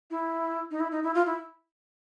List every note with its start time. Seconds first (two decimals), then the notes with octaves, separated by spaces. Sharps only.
0.10 E4
0.71 D#4
0.79 E4
0.91 D#4
1.03 E4
1.14 F4
1.26 E4